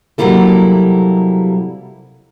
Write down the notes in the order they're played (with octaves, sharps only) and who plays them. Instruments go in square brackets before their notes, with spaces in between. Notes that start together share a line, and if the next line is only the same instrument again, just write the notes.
[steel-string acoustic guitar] C3 F#3 G3 A#3 E4 A4